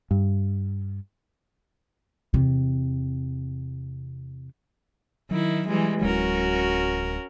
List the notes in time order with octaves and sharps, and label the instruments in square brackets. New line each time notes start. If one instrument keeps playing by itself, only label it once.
[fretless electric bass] G2
[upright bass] E2 C3
[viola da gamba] D#3 E4 [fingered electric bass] F#3
[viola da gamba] E3 G3 G#3
[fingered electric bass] D1 F#3 G#3 [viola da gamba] C#4 F#4 A#4